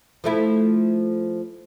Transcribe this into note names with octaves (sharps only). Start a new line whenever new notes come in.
F3 A3 E4